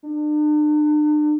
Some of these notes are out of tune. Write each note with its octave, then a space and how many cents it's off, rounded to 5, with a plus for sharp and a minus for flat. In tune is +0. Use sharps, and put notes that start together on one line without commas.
D4 +40